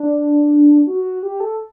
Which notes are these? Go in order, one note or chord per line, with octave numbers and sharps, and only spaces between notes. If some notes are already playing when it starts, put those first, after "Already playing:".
Already playing: D4
F#4
G4
A4